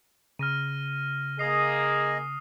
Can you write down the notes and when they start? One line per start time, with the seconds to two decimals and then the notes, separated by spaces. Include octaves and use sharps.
0.39 C#3 F6 A#6 D#7
1.39 A#3 G#4 D#5 D#6 C7